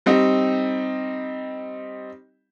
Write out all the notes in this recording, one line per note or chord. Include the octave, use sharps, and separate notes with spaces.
G3 C4 D#4